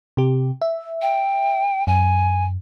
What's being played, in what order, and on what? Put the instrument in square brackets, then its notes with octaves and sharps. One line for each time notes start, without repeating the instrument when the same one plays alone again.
[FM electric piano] C3 G4
E5
[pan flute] G5
[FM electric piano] F#2 [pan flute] G#5